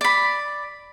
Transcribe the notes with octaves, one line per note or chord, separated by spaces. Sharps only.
D5 B5